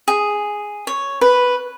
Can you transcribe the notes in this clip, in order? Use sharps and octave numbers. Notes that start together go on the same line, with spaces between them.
G#4
C#5
B4